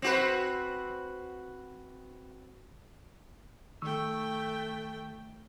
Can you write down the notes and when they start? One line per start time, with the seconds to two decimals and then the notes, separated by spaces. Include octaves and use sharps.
0.02 C4 F#4 B4
3.82 D#3 A3 G5 C#6 E6